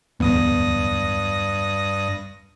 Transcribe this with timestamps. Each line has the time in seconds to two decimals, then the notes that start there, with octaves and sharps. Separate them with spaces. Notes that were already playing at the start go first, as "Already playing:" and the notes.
0.20 D1 E2 G2 B3 D#6 A#6